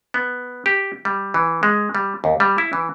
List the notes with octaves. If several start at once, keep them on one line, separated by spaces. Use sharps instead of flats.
B3
G4
G3
E3
G#3
G3
D#2
G3
E4
E3